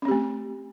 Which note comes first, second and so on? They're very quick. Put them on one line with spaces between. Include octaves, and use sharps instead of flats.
C#4 C4 G4 A3